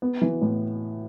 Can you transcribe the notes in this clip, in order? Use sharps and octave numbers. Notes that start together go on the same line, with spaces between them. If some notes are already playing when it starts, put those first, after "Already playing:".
B3
E3
A2